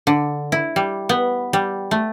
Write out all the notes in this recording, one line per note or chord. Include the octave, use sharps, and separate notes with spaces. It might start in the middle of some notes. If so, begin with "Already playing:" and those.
D3
E4
G3
B3
G3
A3